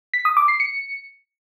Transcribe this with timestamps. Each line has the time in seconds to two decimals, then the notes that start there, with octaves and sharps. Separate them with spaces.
0.14 B6
0.25 D#6
0.37 D6
0.48 C7
0.60 C#7